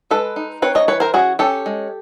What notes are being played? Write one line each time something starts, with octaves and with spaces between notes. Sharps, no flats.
G#3 A4 B4
D#4
C4 B4 C#5
C#5 D#5
E3 B4 C#5
A#4 C5
C#4 F#4 G#4
C#4 G4 A4
G#3